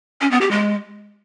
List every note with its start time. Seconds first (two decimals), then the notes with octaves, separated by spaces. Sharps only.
0.21 C#4
0.31 B3
0.41 G4
0.51 G#3